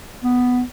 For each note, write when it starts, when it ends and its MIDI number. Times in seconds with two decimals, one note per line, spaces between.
0.23 0.62 59